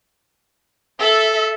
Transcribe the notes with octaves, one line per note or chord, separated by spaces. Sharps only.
A4 E5